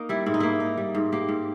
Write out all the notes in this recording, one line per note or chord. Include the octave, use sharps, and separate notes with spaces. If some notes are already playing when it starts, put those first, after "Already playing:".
Already playing: A#3 D#4 A#4
G3 E4
G#2 E4
D#4
A#3 E4
D#4
G3
G#2
A#3 G4
G#2